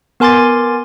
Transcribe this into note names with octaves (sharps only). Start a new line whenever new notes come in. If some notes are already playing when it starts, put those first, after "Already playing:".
B3 A#4 G#5 C6 D6 A6